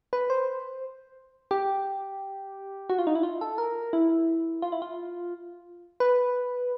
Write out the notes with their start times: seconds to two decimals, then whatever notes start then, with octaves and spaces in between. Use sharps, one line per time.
0.13 B4
0.30 C5
1.51 G4
2.90 F#4
2.99 F4
3.07 D#4
3.15 E4
3.23 F4
3.41 A4
3.58 A#4
3.93 E4
4.62 F4
4.72 E4
4.82 F4
6.00 B4